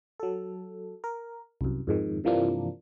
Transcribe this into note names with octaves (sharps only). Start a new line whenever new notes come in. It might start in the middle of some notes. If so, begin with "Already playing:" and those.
F#3 A4
A#4
C2 F#2
F2 G#2 D#3
G2 C3 E3 F3 A#3 D4